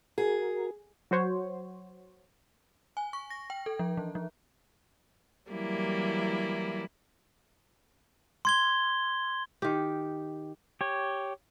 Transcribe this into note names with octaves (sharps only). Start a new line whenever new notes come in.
F#4 G#4 A#4
F#3 F#4 C5 C#5
G#5
C#6
A#6
G5
A4
F3
E3
F3
E3 F#3 G3 A#3 E4
C6 G#6 G7
D#3 G4
G4 C#5